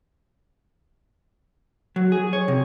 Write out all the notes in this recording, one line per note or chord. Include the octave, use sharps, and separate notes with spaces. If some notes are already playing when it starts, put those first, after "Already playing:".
F#3
G#4
C#5
C3